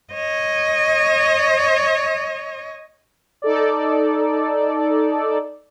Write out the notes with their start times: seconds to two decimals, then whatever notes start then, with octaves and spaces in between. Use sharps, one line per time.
0.13 C#5 D#5
3.42 D#4 A4 D5